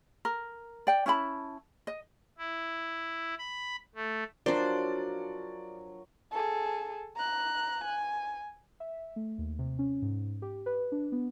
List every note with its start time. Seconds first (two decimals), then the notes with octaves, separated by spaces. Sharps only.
0.25 A#4
0.87 D5 G5
1.06 C#4 E4 A5 B5
1.87 D#5
2.38 E4
3.39 B5
3.95 A3
4.46 F#3 D4 F4 A#4 C5 D5
6.32 G#4 A4
7.16 A#5 F#6
7.84 G#5
8.80 E5
9.16 A3
9.38 D#2
9.59 C3
9.79 C#4
10.02 G#2
10.42 G4
10.66 B4
10.92 D4
11.12 B3